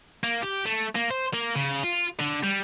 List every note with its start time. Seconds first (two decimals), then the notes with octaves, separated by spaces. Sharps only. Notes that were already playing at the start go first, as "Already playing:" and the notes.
0.23 A#3
0.42 G4
0.66 A3
0.95 A#3
1.10 C5
1.34 A#3
1.56 C#3
1.84 F4
2.19 D3
2.43 G3